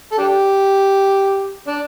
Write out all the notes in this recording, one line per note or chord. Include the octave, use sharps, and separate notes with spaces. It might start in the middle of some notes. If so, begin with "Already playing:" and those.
A4
D4 G4
D4